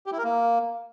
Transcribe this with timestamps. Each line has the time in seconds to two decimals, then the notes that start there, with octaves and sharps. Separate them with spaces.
0.06 G4
0.12 E4
0.18 A#4
0.24 A#3